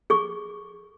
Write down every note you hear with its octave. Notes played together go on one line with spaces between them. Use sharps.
G#4 C#6 D6